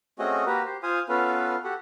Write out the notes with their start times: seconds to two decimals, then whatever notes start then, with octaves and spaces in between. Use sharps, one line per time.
0.19 A3 C4 C#4 F#4 G#4 D#5
0.46 A#3 F#4 G4 A#4 B4
0.65 G4 C5
0.83 F4 C5 F5 G#5 D#6
1.09 B3 C#4 F4 A4 B4 F5
1.64 F#4 G4 A4 F#5